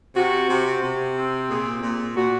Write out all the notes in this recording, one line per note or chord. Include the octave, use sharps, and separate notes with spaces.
C3 F#4
C3
C3
C4
A#2 G#4
A#2
A#2 F#4